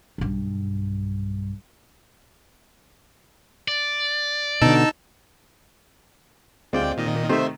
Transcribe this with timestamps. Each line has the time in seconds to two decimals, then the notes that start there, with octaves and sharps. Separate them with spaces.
0.18 B1 G2
3.68 D5
4.62 B2 D3 D#4 A5 E6
6.73 D2 G#3 C4 F4 D5 G5
6.97 A#2 D#3 D#5
7.29 C3 D#3 A3 C5 E5